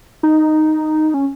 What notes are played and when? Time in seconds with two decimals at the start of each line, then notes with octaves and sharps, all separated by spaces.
0.23 D#4
1.14 C#4